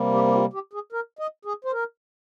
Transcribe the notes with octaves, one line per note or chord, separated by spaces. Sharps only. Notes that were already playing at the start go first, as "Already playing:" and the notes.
Already playing: C3 G3 A#3
G4
G4
F4
G4
G#4
A#4
D#5
G#4
C5
A#4